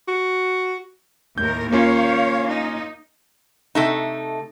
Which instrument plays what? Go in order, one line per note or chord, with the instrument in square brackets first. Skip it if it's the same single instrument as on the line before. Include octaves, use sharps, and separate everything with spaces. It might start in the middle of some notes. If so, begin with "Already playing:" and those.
[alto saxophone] F#4
[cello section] D#2 A2 A#4 [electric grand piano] G6
[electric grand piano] A#3 C#4 F4 [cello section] C#5 F5
[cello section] D#4
[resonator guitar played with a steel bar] C3 A3 D#4